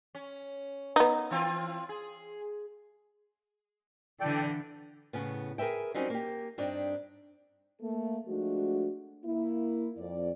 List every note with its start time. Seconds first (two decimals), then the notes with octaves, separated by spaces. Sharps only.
0.15 C#4
0.96 B3 D#4
1.31 E3 C4 F4
1.89 G#4
4.20 D3 E3 A4 D5 G5
5.13 A2 C#3 B3
5.58 G#4 A#4 B4 E5 G5
5.94 F#3 G3 C4 C#4 D#4
6.10 A#3 G4
6.58 G2 C4 D4 D#4
7.81 A3 A#3 A4
8.27 F3 G#3 A3 D4 F#4
9.24 A#3 E4
9.98 F2 D5